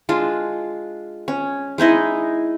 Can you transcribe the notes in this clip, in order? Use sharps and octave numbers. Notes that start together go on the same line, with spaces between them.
G#3 D4 F4
C#4
G#3 D#4 E4 D#5